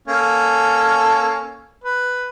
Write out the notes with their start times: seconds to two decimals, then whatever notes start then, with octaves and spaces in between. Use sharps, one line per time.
0.08 A#3 C#4 A4
1.84 B4